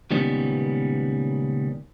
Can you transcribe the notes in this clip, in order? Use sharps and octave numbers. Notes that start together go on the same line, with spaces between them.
C#2 A#2 D#3 G3 B3 C#4